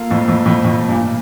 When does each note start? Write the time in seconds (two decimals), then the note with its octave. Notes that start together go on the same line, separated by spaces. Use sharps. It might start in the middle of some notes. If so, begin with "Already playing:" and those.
Already playing: A#3 F4 A4
0.10 F2 A2
0.28 F2 A2
0.46 F2 A2
0.64 F2 A2
0.88 G2 A#2